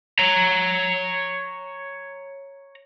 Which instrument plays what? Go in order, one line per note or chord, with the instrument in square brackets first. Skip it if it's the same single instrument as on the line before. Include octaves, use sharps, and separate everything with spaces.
[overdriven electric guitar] C#5 A#5